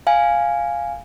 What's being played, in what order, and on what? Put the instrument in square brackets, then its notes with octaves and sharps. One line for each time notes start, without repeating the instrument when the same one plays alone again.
[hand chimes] F5 G#5